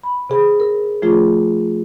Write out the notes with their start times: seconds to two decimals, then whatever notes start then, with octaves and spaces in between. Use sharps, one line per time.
0.03 B5
0.30 C3 G#4 B5
0.60 A#4
1.02 F3 A3 F4 G#4